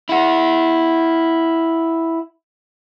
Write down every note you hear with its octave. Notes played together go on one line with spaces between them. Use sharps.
E4 F#5